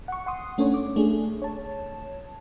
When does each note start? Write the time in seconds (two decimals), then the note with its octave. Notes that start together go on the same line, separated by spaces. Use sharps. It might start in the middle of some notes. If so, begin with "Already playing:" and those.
0.08 F#5 C#6
0.26 F#5 C6 D#6
0.58 A3 C#4 D4 A4 C#5
0.74 D6
0.96 A3 D4 G#4
1.42 C#5 A5